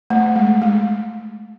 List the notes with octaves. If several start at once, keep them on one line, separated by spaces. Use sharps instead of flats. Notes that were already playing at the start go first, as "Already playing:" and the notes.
A3
G#3
G#3